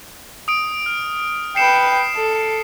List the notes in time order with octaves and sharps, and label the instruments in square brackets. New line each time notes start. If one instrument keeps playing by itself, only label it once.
[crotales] D#6 D7
F6
[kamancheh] B4 G5 [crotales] C7 C#7 E7
[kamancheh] A4